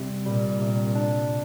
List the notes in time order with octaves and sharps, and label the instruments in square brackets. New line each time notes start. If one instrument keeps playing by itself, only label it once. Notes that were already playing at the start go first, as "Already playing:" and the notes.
Already playing: [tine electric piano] C3 G3
[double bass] A#2 [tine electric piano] G3
[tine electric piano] C3
D4
A#2